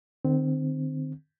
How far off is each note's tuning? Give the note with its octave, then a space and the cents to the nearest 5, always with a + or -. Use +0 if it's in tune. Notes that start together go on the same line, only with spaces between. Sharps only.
D#3 -45 C4 -10